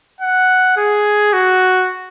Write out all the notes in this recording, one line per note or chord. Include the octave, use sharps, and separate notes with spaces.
F#5
G#4
F#4